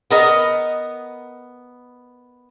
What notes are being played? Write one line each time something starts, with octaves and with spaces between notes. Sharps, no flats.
B3 A#4 D#5